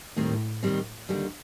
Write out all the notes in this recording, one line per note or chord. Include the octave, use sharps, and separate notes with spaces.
D#2 A2 D#3 G3 C4
D#2 D#3 G3 C4
D#2 D3 G3